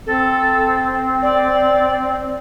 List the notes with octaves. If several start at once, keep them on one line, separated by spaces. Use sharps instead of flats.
C4 A4
D5